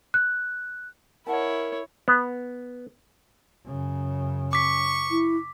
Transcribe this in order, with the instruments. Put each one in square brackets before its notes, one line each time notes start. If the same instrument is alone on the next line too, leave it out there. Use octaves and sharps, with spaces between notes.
[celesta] F#6
[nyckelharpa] E4 C#5 [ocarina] A#4 [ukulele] D#5 F#5 A5
[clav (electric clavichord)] B3
[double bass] F#2 C#3
[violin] C#6 [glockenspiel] D6 B6
[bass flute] E4